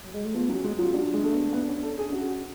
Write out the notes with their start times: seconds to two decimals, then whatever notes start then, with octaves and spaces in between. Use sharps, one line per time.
0.04 F#3
0.14 G#3
0.25 A3
0.34 F3 B3
0.49 F#3 C#4
0.64 G#3
0.78 F#3 F4
0.94 F#3 D4
1.14 G#3
1.24 A3
1.33 B3
1.53 B3
1.67 C#4
1.83 A4
1.98 G#4
2.11 C#4 F#4